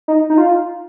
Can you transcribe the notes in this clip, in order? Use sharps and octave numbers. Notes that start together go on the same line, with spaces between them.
D#4
D#4
F4